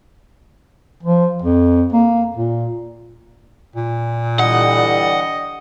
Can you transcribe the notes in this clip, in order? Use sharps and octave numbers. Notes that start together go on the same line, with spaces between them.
F3
F2
A#3
A#2
A#2
D3 E3 G3 D#5 F#5